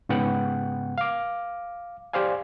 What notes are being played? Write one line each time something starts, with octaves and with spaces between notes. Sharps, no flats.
G#2 C#3 B3 F#5 G5 F#6
F5 D6
G4 C5 D5 F5 G#5